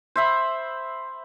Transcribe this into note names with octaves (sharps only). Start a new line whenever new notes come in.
C5 E5 B5